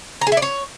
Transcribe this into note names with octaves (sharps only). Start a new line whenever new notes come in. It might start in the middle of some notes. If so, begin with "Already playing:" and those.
A#5
G#4
E4
D5
C#5